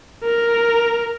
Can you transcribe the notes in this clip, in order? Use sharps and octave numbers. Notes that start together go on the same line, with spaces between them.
A#4